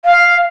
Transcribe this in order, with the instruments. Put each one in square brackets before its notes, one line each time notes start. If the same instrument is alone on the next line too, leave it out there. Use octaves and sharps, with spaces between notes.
[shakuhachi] F5